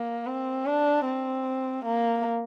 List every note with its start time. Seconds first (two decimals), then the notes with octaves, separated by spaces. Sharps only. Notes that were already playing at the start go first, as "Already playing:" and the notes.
Already playing: A#3
0.26 C4
0.66 D4
1.06 C4
1.85 A#3